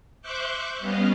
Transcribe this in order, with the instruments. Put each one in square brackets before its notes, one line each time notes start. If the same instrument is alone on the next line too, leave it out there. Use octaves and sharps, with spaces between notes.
[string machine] C5 E5 C#6 D6 F#6 G6
G3 B3 C#4 D#5 F5